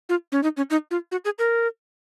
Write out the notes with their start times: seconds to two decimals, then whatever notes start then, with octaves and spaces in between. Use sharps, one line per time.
0.09 F4
0.32 C#4
0.43 D#4
0.57 C#4
0.70 D#4
0.91 F4
1.12 F#4
1.25 G#4
1.39 A#4